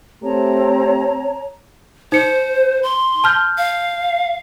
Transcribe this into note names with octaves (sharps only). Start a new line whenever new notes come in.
A3 C4 G4 C#5 A5 A#5
D#4 C5 C#7
C6
A5 F6 G6
F5